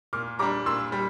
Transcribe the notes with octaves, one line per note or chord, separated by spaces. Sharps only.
A#2 D6 F6
G3 D4 A#5 D6
A#2 C6 E6
G3